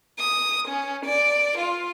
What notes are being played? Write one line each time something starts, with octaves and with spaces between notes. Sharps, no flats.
D#6
C#4
D5
F4